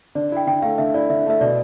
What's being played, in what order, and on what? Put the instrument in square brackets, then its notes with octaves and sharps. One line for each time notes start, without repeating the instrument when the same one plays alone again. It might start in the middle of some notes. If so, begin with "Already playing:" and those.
[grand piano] D3 [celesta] D5
[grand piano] E4 [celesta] G5
[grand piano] D3 [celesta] G5
[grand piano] A3 [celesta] F5
[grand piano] D3 [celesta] E5
[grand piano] E4 [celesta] D5
[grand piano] D3 [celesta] E5
[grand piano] A3 [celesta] E5
[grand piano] B2 [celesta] D5